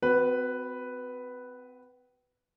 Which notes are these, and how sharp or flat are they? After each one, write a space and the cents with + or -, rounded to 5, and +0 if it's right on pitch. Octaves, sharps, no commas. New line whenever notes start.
C4 -35 F#4 +0 B4 +0